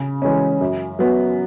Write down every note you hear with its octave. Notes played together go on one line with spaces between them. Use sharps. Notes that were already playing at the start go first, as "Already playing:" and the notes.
Already playing: C#3
E3 G#3 C#4
F#2
F#3 B3